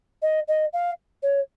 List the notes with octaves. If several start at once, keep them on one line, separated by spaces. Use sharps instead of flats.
D#5
D#5
F5
C#5